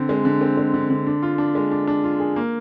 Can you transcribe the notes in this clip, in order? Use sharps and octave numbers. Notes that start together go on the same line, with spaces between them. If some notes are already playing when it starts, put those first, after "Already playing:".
Already playing: D3 C4
G#3
D3
C4
G#3
D3
D3
D4
F4
D4
G#3
D4
D4
F4
G#4
A#3